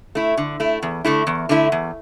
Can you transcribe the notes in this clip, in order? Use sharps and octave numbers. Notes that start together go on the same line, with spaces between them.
A3 E4
D3
A3 E4
E2
D3 A3 E4
E2
D3 A3 E4
E2